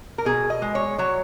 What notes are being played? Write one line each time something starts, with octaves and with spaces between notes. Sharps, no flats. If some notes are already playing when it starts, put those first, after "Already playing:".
A#4
B2 G#4
D#5
G#3
C#5
F#3 C#5